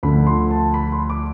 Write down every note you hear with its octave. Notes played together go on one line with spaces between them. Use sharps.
D2 D3 F3 B5
C6
A5
B5
C6
D6